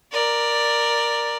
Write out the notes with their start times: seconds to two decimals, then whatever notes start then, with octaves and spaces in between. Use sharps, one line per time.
0.12 A#4 D5